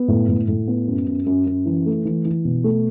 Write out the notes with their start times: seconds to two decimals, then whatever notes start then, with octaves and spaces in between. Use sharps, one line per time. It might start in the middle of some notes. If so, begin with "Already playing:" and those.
Already playing: B3
0.08 A2
0.29 A2
0.48 A2
0.68 B3
0.87 F#2
1.07 F#2
1.26 F#2
1.46 F#2
1.66 E3
1.86 A3
2.05 E3
2.25 E3
2.45 B2
2.64 A3